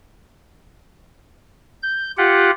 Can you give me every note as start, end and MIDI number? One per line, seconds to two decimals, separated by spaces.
1.83 2.11 91
2.17 2.51 65
2.17 2.51 67
2.17 2.51 78